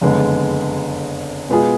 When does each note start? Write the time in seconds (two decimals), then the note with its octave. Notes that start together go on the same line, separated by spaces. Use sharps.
0.01 F#1 F2 D3 G#3 B3
1.49 B2 G#3 B3 F4 G#4